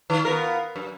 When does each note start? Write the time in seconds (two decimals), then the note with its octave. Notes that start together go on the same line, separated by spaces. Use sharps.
0.10 D#3
0.25 B3 F4 A#4
0.76 F#2